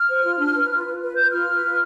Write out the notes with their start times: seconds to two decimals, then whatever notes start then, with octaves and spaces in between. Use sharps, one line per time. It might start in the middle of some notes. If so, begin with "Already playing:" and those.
Already playing: F6
0.08 C5
0.24 F4
0.39 D4
0.55 B4
0.70 F4
0.85 F4
1.01 B4
1.16 B4 G6
1.31 F4 F6
1.47 B4
1.63 F4